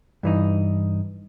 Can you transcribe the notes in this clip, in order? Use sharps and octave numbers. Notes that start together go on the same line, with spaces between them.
G2 E3 D#4